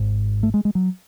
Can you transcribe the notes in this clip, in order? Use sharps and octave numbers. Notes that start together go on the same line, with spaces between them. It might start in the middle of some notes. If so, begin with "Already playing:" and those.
Already playing: G#1 G#2
A3
G#3
G#3
F#3